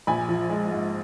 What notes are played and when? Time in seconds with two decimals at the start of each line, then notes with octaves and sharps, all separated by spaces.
0.07 A#1 G#5 B5
0.29 F3
0.50 G#3
0.71 G#2